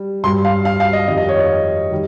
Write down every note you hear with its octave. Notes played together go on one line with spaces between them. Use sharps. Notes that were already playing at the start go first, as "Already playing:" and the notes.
Already playing: G3
G2 G3 C6
F5
F5
F5
D#5
F2 D#3 G3 D#5
D#5
C#5
D#5
D#3 G3